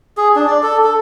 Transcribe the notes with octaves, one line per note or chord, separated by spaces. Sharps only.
G#4
D4
D5
A4
A4